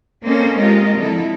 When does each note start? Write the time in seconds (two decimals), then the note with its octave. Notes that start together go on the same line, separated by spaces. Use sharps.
0.24 A#3 C4 C#4 A4 C5 D#5
0.57 G#3 C4 F4 G4 A#4 D#5
0.97 D3 F3 C4 E4 A4